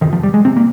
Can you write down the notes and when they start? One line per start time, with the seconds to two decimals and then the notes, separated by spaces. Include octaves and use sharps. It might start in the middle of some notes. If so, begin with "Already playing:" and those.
0.01 C3 D#3
0.05 F2
0.13 F3
0.23 G3
0.34 G#3
0.45 C3 C4
0.57 A#3